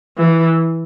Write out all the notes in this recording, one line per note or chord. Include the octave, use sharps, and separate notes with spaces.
E3